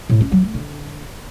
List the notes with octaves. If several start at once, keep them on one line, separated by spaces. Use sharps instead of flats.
A2
C#4
F#3
A3
D3